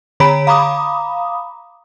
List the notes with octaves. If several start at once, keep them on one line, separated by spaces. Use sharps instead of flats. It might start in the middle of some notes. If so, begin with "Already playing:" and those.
D3 C#5 A#5 B5 B6 D7
F5 A#5 B5 D6 D#6